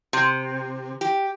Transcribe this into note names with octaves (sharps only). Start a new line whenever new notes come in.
C3
G4